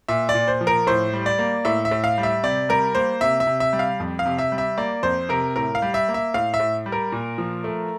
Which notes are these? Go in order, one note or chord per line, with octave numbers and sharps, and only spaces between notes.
A#2 E5
D5
A#2
C5
F3
A#4
A2 C5
G3
D5
A#3
A2 E5
E5
A2
F5
G3
E5
C3 D5
G3 A#4
A#3 C5
C3 E5
E5
C3
E5
G3
F5
F2
F5
C3
E5
G3
E5
A#3 D5
F2 C5
C3 A#4
A2 A#4
F5
G3
E5
A#3
E5
A2 F5
E5
A2
G3
A#4
A#2
F3
A3